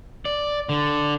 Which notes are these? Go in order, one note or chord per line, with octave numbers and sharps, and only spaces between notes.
D5
D3